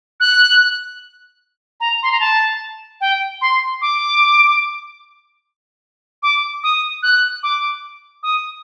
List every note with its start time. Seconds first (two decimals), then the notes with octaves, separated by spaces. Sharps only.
0.20 F#6
1.80 A#5
2.03 C6
2.12 A#5
2.20 A5
3.01 G5
3.41 C6
3.81 D6
6.23 D6
6.63 D#6
7.03 F#6
7.43 D6
8.23 D#6